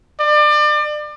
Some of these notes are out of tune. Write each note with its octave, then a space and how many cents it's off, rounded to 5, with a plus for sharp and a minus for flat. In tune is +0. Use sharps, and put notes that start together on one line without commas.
D5 +30